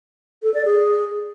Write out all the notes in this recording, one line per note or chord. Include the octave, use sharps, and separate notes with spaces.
A4
D5
G#4